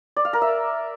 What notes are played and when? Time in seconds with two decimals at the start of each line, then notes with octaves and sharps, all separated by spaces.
0.17 D5
0.25 F5
0.33 A#4
0.42 E5